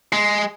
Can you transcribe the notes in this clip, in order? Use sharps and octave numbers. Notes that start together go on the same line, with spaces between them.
G#3